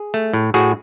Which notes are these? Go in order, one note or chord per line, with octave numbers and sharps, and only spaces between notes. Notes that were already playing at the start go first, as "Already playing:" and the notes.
Already playing: G#4
A3
A2
A2 F#4 G#4